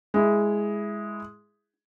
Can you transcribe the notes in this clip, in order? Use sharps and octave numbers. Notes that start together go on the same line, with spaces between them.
G#3 E4